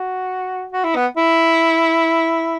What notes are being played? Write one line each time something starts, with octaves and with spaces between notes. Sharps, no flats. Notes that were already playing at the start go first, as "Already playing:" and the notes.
Already playing: F#4
F#4
E4
B3
E4